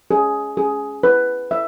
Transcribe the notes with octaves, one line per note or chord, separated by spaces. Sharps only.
G#4
G#4
B4
E5